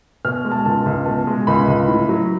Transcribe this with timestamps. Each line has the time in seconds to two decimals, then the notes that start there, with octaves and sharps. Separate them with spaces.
0.25 B2 F6
0.45 G#3
0.52 A5
0.65 C#2 A5
0.86 C#2
1.06 B2 A5
1.27 G#3
1.47 C#2 B5
1.68 C#2
1.88 A2
2.09 F#3